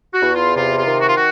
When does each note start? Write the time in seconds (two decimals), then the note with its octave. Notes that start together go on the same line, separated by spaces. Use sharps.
0.12 F#4
0.23 E2
0.34 F4
0.55 C3 F4
0.76 F4
0.87 D#3
0.98 F#4
1.07 F4
1.16 F#4